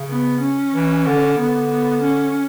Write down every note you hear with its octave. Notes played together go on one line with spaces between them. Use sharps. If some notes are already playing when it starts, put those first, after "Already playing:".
Already playing: C#3
B3
C#4
E3
D3
D3 B3
B3
C#4